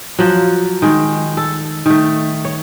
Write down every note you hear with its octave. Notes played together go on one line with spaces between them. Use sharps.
F3 F#3
D#3 G#3
A4
D#3 A3
C#5